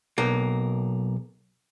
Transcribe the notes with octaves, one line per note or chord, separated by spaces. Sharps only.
B1 A#3